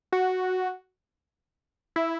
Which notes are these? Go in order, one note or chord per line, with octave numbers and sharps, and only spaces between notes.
F#4
E4